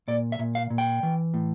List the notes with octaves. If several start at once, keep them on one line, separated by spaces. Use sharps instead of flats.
A#2 D5
E5
A#2
F5
A#2
G5
E3
A2